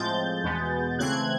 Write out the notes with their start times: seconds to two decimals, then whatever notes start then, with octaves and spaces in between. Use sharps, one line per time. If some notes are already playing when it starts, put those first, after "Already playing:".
Already playing: A2 F3 G#3 C4 G6 A6
0.44 E2 B2 G#3 B3
0.99 C#3 E3 A3 C4 F#6 G#6